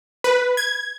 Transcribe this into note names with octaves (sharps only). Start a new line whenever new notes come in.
B4
G#6